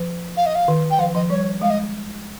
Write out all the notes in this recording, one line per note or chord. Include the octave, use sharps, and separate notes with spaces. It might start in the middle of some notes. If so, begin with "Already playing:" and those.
Already playing: F3
F5
D#5
F5
D#3
G5
F3 F5
F3 D#5
G3 C#5
G#3 F5
D#5